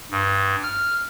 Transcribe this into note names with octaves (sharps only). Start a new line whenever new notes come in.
G2
F6